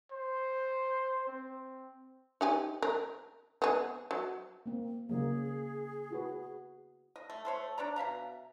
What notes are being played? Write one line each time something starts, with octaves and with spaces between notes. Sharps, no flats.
C5
C4
D#4 G4 G#5
A#4
B3 G#4
F#3
A#3 C4
C#3 F#3 A#3 G#4
E4 F#4 B4
D#5
A3
A3 C5 C#5
D4 C#5 D5 A#5
B2 E5 F5 A#5